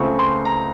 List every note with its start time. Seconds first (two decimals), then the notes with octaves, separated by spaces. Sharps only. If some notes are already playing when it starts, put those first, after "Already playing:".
Already playing: C#2 C#3 A3 C4 C#6
0.19 C6
0.45 A#5